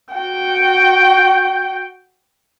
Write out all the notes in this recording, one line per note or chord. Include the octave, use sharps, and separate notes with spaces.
F#4 G5